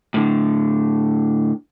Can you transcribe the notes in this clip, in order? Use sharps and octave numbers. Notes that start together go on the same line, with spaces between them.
A2 D3